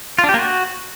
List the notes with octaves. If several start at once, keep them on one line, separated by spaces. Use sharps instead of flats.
F4
D4
G4
A#3
F#4